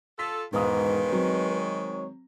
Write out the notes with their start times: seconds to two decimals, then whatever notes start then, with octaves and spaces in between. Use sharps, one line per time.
0.19 F4 A4 B6
0.53 E1 G#2 D#3 G#3 B4 F5 D#6
1.10 F#3 C4 C#5